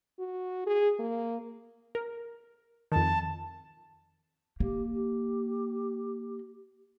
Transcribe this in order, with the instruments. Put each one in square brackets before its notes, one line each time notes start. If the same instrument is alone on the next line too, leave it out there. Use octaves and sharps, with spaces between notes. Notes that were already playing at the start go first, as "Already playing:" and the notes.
[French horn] F#4
G#4
A#3
[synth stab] A#4
[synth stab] F2 D#3 [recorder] A5
[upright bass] A#3 [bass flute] G4
[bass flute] G4